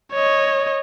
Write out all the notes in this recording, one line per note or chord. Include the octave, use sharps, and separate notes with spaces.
C#5 D#5